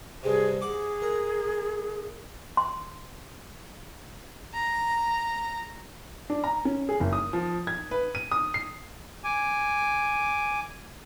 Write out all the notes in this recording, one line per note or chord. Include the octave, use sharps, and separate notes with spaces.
G2 C3 G#4
G#4 F#5 D6
A#4
C6
A#5
D4
A#5
C#4
G#4
F#1
D#6
F3
G#6
B4
D#7
D#6
C7
G#5 D6